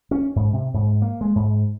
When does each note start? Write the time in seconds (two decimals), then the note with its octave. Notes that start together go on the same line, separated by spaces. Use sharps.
0.11 C#4
0.36 G#2
0.53 C3
0.74 G#2
1.02 A#3
1.21 G#3
1.35 G#2